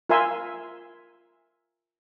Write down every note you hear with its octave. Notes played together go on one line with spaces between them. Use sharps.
F4 A#4 E5 G#5 C6 E6